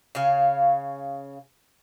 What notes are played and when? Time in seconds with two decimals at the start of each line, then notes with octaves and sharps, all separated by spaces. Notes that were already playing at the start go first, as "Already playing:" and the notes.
0.15 C#3 C#5 F5